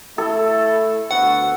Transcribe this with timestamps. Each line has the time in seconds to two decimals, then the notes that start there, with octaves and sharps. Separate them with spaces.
0.18 A3 E4 A4
1.11 D2 B3 F#4 F#5